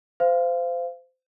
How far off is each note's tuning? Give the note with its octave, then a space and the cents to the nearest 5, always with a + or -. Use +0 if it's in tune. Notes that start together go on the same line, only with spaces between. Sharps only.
C5 -25 F5 -15